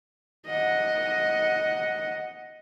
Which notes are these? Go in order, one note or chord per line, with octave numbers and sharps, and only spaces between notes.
D#5 F#5